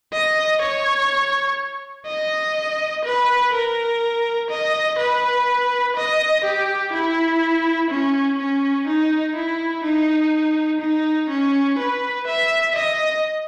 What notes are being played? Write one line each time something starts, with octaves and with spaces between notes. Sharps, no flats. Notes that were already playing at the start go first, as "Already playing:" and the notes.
D#5
C#5
D#5
B4
A#4
D#5
B4
D#5
G4
E4
C#4
C#4
D#4
E4
D#4
D#4
C#4
B4
E5
D#5